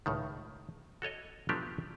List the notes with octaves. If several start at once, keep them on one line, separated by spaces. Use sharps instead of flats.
C#2 A2 D#3
F#4 A4 C#5 D#5
F3 F#3 A3 B3 D4 G4